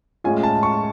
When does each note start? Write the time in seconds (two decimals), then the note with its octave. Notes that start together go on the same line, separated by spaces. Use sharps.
0.24 A2 G#3 C#4 F4 G#5
0.43 A5
0.63 C#6